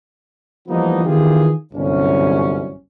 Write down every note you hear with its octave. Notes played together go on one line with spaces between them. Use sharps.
E3 F3 G3 A#3 B3 D#4
D#3 E3 B3 F4 G4 G#4
G1 C2 F#2 C#4